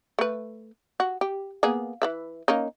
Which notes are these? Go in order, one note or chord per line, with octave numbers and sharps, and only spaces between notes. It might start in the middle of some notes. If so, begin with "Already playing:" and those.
A3 B4
F#4
G4
A#3 B3 G#4
E3 B4 E5
A#3 C#4 D#4